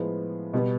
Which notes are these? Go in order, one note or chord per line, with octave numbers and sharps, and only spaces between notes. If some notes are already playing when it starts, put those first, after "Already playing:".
Already playing: A2 F3 G#3 B3
B2 G3 B3